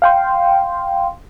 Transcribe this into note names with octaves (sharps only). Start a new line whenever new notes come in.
F5 G5 C6